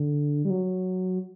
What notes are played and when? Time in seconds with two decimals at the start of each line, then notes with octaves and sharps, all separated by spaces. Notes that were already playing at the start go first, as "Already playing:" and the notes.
Already playing: D3
0.45 G3
0.50 F#3